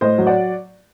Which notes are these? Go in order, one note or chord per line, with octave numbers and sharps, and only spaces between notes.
A2 C5 D#5
F#3
D5 F#5